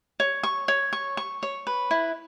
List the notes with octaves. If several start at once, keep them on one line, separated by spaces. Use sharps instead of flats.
C#5
C#6
C#5
C#6
C#6
C#5
B4
E4